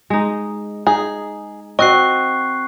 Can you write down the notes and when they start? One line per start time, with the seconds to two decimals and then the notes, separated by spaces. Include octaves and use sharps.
0.10 G#3 D#4
0.87 D#4 G#4
1.79 C4 F#4 D#5 C#6 F#6 C7